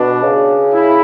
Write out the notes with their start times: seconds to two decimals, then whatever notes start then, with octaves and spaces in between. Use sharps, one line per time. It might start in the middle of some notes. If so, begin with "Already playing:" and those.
Already playing: B2 D4
0.23 C#3
0.73 E4